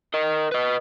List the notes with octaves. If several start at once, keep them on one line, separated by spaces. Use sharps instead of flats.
A#4 D#5
B4 D#5